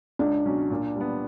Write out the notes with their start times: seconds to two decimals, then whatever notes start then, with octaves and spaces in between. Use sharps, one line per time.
0.19 C#2 D4
0.45 B2 F#3 C#4
0.70 A#2
0.96 G3 B3